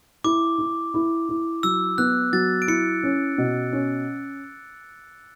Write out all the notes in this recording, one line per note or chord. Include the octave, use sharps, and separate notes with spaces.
E4 D6
E4
E4
E4
F#3 E6
B3 F#6
F#3 A6
D7
E4 C#7
C#4
B2
C#4